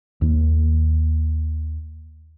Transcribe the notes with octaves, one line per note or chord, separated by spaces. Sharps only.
D#2 A#3